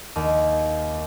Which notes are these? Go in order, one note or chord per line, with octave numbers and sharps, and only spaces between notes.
D#2